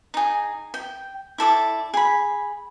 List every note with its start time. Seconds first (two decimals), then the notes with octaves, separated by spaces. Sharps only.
0.14 D#4 G#4
0.74 G5
1.38 E4 A4 D5 D6
1.94 G#4 B5